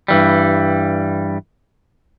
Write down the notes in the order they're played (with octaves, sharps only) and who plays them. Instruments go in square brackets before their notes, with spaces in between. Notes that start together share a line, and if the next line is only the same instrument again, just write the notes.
[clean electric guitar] G2 E3 G3